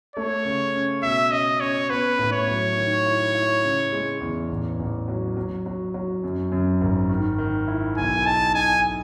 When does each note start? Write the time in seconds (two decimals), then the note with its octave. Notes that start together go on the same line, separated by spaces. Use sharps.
0.16 A3 C#5
0.45 C#3
0.75 C#4
1.03 B2 E5
1.31 C#4 D#5
1.61 C#4 C#5
1.89 B3 B4
2.18 A2
2.33 C#5
2.47 F#3
2.77 D#3
3.06 E4
3.35 E4
3.63 C#3
3.92 G#3
4.21 E2
4.50 A1
4.79 A1
5.08 F#3
5.37 F#3
5.66 F#3
5.94 F#3
6.24 F#2
6.52 F#2
6.81 G#1
7.09 D#3
7.38 D#3
7.68 E4
7.97 B1 G#5
8.26 D#4 A5
8.54 D#4 G#5